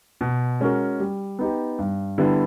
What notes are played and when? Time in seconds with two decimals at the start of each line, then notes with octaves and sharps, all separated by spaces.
0.21 B2
0.60 G#3 C#4 F#4 A#4
1.00 G3
1.39 B3 D#4 G4
1.79 G2
2.18 D3 G3 B3 E4